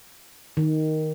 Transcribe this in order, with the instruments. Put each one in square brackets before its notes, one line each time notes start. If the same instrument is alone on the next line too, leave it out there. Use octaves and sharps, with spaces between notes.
[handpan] D#3